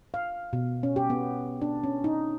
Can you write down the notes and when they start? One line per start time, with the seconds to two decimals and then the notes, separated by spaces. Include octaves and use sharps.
0.14 F5
0.53 B2
0.83 C#4
0.96 G4
1.10 B3
1.62 D4
1.84 C#4
2.04 D#4